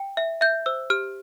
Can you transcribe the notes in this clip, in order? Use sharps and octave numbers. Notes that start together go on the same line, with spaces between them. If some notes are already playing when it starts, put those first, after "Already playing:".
Already playing: G5
E5
E5 G6
C5 E6
G4 F6